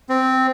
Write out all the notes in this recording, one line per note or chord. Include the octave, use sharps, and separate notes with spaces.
C4